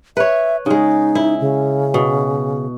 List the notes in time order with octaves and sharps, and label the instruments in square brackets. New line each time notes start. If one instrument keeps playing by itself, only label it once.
[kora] B4 C#5 [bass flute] E5
[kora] C#3 G#3 [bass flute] D#4
[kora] E4
[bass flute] C#3
[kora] B2